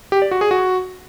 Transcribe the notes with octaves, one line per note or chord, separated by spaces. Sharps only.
G4
D5
F#4
G#4
F#4